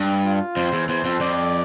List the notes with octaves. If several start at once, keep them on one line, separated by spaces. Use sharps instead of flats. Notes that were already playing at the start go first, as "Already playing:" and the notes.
Already playing: G2
F4
F2 C5
E2
E2 C5
F2
F2 D5